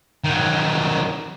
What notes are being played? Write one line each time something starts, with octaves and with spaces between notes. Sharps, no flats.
D#3 F#3